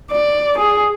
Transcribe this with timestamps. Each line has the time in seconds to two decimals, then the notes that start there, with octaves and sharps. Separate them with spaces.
0.11 D5
0.58 G#4